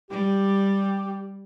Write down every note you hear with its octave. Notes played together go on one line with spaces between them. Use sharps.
G3 G4